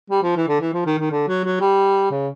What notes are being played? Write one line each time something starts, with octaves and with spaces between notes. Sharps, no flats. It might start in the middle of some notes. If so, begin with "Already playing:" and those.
G3
F3
E3
D3
E3
F3
D#3
D#3
D3
F#3
F#3
G3
C#3